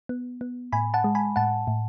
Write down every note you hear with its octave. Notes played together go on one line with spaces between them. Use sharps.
B3
B3
A2 G#5 B5
F#5 A5
G#3
G#5 B5
A2 F#5 A5
A2